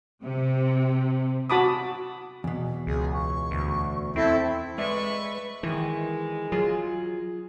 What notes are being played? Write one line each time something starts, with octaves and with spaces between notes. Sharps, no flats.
C3
F#4 A5 B5 D6 D#6
E2 B2
C#2 G#4
C#6
D2
C4 E4 A4
G#3 B4 D5 E5 C#6
D#3 E3 G#3
F#3 F4 G#4